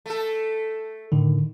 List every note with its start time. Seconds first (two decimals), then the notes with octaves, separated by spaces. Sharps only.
0.06 A3 A4
1.12 A2 D3 D#3